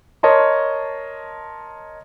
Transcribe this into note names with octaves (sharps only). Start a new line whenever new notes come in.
A#4 C#5 D#5 A5 C6